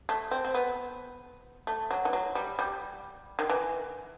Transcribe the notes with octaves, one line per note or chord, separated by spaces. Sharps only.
A3
C4
C4
B3
A3
F#3
E3
F#3
G3
G3
D#3
E3